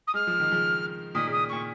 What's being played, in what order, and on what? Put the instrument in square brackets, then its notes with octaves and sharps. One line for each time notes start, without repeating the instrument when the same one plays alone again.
[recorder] D#6
[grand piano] G#3 [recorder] F6
[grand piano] F3
D#3
C#3 F3
[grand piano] A#2 D#3 [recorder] D#6
[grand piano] C#3
[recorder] D#6
[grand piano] A#2 [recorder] C#6